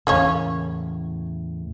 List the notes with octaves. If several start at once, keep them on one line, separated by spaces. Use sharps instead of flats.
E2 A2 C#3 A#3 C#4 C#5